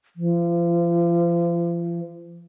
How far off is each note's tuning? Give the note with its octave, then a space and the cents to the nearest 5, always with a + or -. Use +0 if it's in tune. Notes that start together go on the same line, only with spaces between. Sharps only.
F3 -35